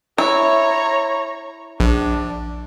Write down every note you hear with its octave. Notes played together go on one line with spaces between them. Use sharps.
E4 C#5 A#5
A#1 D4